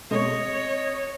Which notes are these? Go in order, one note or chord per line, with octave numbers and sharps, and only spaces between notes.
B2 G#3 A3 C4 C#5 D#5 C#6